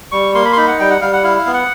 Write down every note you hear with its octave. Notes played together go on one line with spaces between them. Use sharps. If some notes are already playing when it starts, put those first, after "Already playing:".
G3 C#6
A#3 C6
B5
C6
D#4 B5
F#5
G3 G5
F#5
G3 F5
F#5
E4 F5
F5
B3
F#5